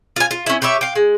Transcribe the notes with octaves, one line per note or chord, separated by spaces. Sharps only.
F4 G#5
F4
C#4 E4
G4 B4 C#5 E5
F5 G5
G#3